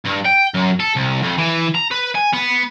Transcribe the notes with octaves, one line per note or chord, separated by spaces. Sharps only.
G2
G5
F#2
A4
C2
F2
E3
A#5
B4
G#5
B3